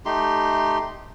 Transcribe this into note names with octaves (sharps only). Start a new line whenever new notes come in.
A3 D#4 G4 C6